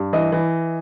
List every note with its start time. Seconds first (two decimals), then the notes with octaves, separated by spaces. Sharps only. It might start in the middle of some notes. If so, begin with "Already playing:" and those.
Already playing: G2
0.13 E3 D#5
0.32 E3